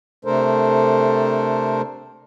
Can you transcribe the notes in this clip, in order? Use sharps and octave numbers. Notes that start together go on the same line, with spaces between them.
C3 A3 D4 A4 A#4 C5